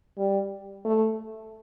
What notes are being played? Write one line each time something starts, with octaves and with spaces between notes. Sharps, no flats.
G3
A3